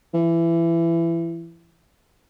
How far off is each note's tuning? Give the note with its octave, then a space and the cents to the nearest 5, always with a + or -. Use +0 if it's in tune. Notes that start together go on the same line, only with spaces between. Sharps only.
E3 +20